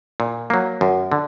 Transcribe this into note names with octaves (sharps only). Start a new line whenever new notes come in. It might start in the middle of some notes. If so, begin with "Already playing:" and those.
A#2
F#3 A#3
F#2
D3